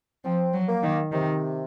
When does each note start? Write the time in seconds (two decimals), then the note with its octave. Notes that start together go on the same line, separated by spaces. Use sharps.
0.25 F3 C4
0.54 F#3
0.68 A#3
0.83 D#3
1.12 C3 D#3